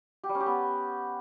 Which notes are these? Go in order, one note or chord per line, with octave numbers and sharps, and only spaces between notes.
G4
G3
C#4
G4
B3